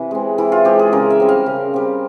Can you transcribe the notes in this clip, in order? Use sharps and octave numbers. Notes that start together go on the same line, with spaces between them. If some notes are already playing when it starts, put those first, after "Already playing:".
Already playing: C3 E3
G#3 C4
E3 E4
F4
G#3 C4 G4
G#4
C#3 A#4
E5
G3 C4
F5
C#3
G3 C4